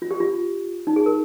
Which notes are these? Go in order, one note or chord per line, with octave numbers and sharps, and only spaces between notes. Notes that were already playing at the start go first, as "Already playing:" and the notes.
F4
G4
F4
D#4
G#4
A#4